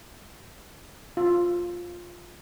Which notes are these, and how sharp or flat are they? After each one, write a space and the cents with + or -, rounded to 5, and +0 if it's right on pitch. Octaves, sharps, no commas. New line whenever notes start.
F4 +5